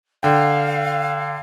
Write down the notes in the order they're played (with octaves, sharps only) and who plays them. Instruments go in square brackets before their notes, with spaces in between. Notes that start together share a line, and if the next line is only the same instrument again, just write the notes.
[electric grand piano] D3 G5 [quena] F5